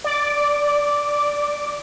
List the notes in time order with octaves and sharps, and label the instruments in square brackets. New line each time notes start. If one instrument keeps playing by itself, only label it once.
[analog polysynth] D5 D6